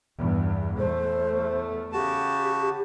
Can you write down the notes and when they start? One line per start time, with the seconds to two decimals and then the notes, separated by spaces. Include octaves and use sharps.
0.18 E2 G2
0.78 E2 A3 C5
1.93 C#3 F#4 G4 A5